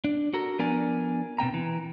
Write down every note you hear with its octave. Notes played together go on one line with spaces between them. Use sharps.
D4
F#4 A4 A#4
F3 B3 D4 A#4 D5 G#5
B2 C4 G5 A#5
E3